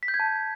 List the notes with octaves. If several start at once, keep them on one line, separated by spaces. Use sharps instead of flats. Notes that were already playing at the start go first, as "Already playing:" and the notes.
B6
G6
G#6
A5